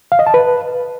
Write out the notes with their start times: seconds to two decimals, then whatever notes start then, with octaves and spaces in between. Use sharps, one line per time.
0.12 F5
0.19 D#5
0.27 A5
0.34 B4